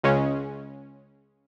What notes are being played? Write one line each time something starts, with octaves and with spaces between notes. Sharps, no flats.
C#2 C#3 G#3 C#4